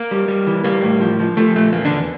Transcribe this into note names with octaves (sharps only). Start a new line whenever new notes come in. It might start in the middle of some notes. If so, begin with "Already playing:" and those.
Already playing: A#3
G3
G3
E3
G3 A#3
A2
F3
F3
F3 A3
A#2 A3
E2 A#3
D3 D4
E2